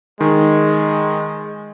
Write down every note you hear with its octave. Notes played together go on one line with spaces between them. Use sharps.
D#3 G#3